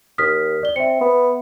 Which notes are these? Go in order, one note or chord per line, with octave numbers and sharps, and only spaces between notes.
D#2 D#6 F6 B6
D5 G7
C4 E5 C#7
B3